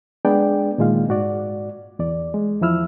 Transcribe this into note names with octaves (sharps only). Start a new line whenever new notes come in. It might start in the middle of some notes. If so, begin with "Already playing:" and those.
G#3 B3 D4 G#4 D5 G5
A#2 D#3 G#3 F4 F5
G#2 F#4 D5
E2 D5
G#3
E2 F3 E4 E6 F6